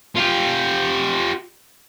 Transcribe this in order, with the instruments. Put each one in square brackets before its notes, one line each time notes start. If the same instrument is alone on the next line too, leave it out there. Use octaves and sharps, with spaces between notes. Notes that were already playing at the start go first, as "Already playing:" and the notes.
[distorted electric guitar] F4 G4